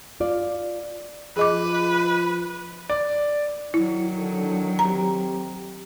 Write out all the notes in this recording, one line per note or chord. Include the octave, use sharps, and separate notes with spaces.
F4 D5
F3 G#4 B4 D#5 D6
D5
D#3 F#3 E4
D3 D4 A4
C4 G4 A#5